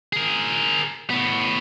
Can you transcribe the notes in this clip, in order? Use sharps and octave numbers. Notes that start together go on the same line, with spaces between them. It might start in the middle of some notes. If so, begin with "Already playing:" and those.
G#4 A#4
A2 B3